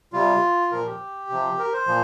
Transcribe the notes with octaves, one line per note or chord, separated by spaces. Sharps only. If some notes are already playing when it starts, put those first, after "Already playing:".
C3 G3 F4
A#2 F3 A#4
G4
C3 F3
A#4
C5
A#2 F3